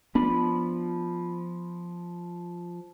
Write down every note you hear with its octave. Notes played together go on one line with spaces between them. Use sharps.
F3 B3 D4 B5